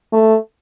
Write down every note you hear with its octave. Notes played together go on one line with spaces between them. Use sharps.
A3